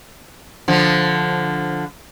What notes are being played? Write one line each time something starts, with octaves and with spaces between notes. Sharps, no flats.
D3 F3